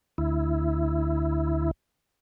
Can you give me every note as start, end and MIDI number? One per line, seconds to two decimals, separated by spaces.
0.18 1.71 38
0.18 1.71 64